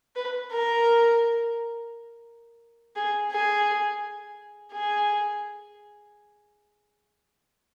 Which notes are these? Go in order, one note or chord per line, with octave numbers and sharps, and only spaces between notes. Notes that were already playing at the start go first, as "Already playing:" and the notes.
B4
A#4
G#4
G#4
G#4